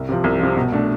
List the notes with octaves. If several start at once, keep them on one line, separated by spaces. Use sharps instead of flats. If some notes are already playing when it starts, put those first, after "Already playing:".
Already playing: C2
C3 F3
C2
C3 F3
B2
A3 D4